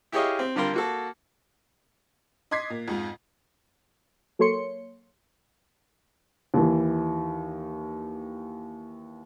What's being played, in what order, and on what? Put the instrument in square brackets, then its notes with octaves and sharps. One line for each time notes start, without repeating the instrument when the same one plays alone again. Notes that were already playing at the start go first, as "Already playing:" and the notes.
[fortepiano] E4 G4 G#4 C#5 D#5 F5
C4
D3 G3 F4 G4 A#4 C6
A#3 F#4 A4
[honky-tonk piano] D#5 C6 D6 G#6 B6 C7
A#2
F2 G#2 F4
[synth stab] F#3 A#3 A4 C#5 C6 C#7
[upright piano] D#2 E3